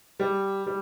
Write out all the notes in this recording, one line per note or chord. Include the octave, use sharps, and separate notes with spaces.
G3
G3